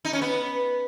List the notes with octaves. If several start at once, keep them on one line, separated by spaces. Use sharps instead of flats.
D#4
C#4
B3